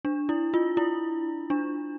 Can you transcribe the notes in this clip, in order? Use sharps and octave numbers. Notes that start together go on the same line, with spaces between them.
D4
E4
F4
E4
D4